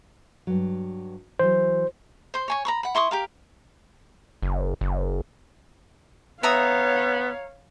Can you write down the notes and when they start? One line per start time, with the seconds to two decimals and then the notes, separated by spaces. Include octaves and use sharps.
0.47 G2 F#3
1.39 E3 F#3 C5
2.34 C5 C6
2.48 C#5 G#5 C#6
2.65 A#5 B5 C#6
2.83 F#5 B5
2.95 E4 C6 C#6 D#6
3.11 G4 A#4 F5
4.43 F#1
4.81 F#1
6.43 B3 C#5 E5 F5 A#5 D#6